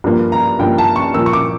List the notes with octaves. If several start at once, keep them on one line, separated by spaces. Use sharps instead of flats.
G2 F3 A#3
A#5
G2 F3 A#3 G5
A5
C#6
A#2 F3 A#3 E6
C#6
D6